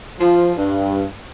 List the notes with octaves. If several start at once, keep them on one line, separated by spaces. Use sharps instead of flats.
F3
G2